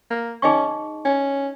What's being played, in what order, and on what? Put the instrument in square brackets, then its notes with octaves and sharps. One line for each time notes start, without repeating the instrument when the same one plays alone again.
[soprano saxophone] A#3
[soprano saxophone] C#4 [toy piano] D#4 G#4 D#5 C#6
[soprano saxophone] C#4